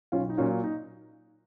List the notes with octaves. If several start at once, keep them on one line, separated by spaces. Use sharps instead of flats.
B1 C#4 F4
D#4
A#2 F#3 A#3 C#4 F4
D#4